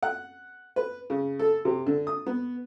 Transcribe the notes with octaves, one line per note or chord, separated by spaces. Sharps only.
F#5
B4
C#3
A4
C3
D3
D#6
B3